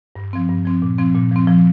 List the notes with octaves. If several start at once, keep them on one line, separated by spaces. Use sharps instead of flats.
G2
F3 C4
G2
F3 C4
A#2
F3 C4
A#2
F3 C4
F3